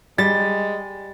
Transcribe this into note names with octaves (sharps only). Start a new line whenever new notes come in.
G3 G#3 A6